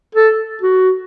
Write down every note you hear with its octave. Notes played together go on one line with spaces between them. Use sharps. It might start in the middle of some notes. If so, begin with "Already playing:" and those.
A4
F#4